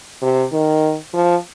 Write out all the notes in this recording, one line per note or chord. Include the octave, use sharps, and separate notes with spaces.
C3
D#3
F3